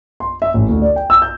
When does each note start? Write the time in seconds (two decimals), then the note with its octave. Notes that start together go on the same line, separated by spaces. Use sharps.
0.20 C6
0.42 E5
0.54 A1
0.69 D2
0.82 D5
0.96 G5
1.10 E6
1.22 G6